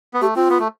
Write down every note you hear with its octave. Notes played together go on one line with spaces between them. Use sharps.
B3
A3 G4
C4 F4
B3
A3